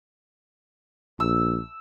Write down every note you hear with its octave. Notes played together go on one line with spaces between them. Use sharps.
A#1 E6